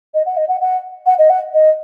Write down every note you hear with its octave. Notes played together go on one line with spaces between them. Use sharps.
D#5
F#5
D#5
F#5
F#5
F#5
D#5
F#5
D#5